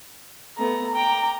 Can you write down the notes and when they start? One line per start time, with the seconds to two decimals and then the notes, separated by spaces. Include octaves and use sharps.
0.58 A3 B3 A#5
0.95 G5 A#5 D6